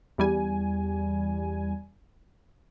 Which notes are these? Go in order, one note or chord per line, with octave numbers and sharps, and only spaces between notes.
E2 G3 G#5